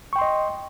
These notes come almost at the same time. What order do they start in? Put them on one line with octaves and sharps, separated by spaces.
C#6 G5 C6 D#5